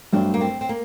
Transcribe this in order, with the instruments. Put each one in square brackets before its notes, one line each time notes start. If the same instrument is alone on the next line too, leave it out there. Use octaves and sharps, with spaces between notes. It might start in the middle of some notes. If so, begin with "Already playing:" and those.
[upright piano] G2 F#3 A3 D4 [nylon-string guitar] C4
[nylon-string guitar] A#3
C4
C4
A#3